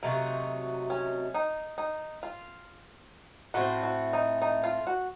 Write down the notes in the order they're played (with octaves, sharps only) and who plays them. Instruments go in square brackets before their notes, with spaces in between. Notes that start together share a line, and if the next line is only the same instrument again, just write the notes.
[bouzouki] C3 F#3 A3 D#4 [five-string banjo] A#3
[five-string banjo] C#4
D#4
D#4
F4
[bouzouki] A2 A3 C4 [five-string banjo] F#4
[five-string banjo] F#4
D#4
D#4
F4
F#4